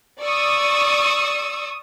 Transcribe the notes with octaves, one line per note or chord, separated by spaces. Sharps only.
D5 C#6 D#6 E6